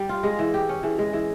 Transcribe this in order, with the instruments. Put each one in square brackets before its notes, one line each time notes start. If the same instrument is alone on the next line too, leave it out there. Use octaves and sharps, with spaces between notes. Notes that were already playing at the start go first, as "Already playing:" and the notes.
Already playing: [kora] G3 [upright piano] G4
[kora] F4
[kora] G#3 [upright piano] G#4
[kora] E3
G4
C#4
[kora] E3 [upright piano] G#4
[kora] G#3 [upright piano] G#4
[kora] E3 [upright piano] G#4